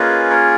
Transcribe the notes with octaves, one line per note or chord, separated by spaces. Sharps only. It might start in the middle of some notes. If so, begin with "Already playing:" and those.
Already playing: A#3 C#4 F4 G#4 B4 D#5
A#4 C#5